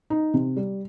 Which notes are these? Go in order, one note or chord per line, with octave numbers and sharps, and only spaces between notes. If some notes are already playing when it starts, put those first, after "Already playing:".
D#4
C3
G3